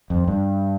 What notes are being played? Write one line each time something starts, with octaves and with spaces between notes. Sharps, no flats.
F2
G2